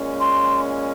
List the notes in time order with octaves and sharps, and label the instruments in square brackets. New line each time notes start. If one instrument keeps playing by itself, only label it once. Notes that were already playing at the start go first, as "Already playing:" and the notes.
Already playing: [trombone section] A#2 G#3 C#4
[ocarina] C6